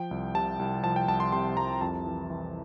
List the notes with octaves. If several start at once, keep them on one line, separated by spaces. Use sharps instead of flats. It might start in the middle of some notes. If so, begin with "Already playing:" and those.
Already playing: F3 G5
C2
C3 A5
C2
F3 A5
G5
C2 A5
C6
C3 C6
C2 A#5
F2 A5
E3
E3